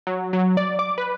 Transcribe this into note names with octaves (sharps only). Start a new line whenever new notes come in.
F#3
F#3
D5
D6
B4